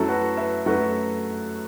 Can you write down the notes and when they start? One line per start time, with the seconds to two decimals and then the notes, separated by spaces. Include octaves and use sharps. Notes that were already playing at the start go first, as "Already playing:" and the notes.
Already playing: F#2 F#3 A3 E4 A4
0.08 F#4 B4
0.37 B4 E5
0.66 F#2 F#3 A3 F#4 B4